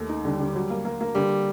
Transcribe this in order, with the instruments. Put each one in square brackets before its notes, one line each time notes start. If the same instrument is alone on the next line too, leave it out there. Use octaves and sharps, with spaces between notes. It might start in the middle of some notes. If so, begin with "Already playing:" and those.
Already playing: [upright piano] D#2 A3
D#4
[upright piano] D3 [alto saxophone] G3
[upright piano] D3
F#3
A#3
A#3
A#3
[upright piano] D3 [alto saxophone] G3